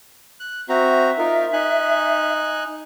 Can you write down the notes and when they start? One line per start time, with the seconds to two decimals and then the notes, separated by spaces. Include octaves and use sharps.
0.40 F#6
0.69 C4 F#4 E5 A#5
1.18 D#4 F4 A#4
1.53 D#4 G#5 F#6